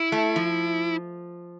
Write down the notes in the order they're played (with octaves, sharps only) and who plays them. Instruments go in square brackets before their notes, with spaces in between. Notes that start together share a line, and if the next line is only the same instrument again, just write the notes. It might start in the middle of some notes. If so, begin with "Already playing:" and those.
Already playing: [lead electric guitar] E4
[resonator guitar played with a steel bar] A3
F3